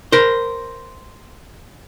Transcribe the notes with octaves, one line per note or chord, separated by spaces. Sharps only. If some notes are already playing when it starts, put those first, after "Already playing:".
A#4 C5